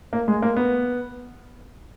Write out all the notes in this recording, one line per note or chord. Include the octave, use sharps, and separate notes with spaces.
A#3
G#3
A#3
B3